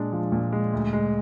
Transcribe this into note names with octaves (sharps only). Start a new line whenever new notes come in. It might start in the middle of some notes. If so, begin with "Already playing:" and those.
Already playing: A#2 G#3 D4
F3
A#2
G#3
D2
G#3